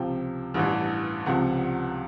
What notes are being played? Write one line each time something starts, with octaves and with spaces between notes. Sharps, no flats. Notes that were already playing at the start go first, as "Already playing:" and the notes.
Already playing: C#2 C3 F3 G5
A1 G2 E3
C#2 C3 F3 F#5